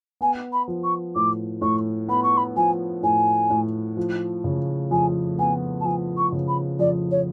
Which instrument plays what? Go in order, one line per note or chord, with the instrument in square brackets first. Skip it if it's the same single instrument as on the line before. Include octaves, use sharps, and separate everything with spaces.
[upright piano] B3 [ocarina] G#5
[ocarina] B5
[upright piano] F3
[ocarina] C#6
[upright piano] A2 [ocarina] D6
[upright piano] A2 [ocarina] C#6
[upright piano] B3 [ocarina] B5
[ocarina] C#6
B5
[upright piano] F3 [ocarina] G#5
[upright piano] A2 [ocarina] G#5
[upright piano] A2
F3
C#3
[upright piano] F2 [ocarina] G#5
[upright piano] B3 [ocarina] G#5
[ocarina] A5
[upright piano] F3 [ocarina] G#5
[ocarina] C#6
[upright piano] C#3
[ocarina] B5
[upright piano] F2 [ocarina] D5
[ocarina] C#5